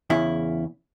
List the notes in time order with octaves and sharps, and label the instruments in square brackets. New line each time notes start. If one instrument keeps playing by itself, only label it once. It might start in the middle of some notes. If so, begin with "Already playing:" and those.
[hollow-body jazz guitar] E2 C#3 E4